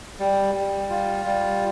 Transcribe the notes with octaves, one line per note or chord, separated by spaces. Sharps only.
G3
G3
F4
G3